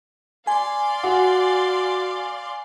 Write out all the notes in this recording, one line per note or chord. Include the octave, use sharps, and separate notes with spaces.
D5 F5 G#5 C6
F#4